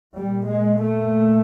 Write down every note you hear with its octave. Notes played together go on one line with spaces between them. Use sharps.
A#2 G3
G#3
A3